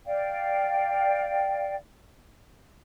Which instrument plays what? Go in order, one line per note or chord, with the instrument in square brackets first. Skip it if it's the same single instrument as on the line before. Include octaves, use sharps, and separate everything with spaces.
[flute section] D5 F5 G5